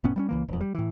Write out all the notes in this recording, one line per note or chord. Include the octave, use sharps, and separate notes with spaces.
F1 A2 B3 C#4
G3 A3 C#4
C#2 E3 A#3
E1 F2
G3
A2 E3